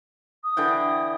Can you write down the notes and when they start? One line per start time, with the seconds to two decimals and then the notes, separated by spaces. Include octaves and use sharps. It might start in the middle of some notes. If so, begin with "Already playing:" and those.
0.43 D#6
0.57 D3 E3 G5